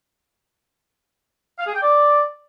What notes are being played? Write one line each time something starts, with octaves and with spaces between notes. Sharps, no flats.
F5
G#4
G5
D5